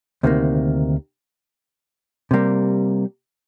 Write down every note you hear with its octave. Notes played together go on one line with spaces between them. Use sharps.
D2 C3 D#3 A#3
C3 G3 A#3